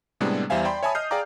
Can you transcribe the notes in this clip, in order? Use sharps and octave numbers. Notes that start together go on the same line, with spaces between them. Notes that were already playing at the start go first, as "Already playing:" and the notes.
A2 C3 G3 G#3 B3 D4
E2 G3 C5 E5 F5 G#5
D5 G5 B5 C6
C#5 E5 G#5 A5 B5 D#6
D#5 D#6 F6 G6 C7
G#4 D5 F5 G5 A#5 D6